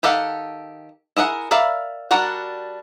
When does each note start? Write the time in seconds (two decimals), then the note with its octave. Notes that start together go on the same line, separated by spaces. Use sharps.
0.03 D#3 G4 A4 F5 F#5
1.17 E4 G#4 A#4 F#5
1.51 A#4 D5 E5 F5 B5
2.11 G3 D4 F#4 A#4 F#5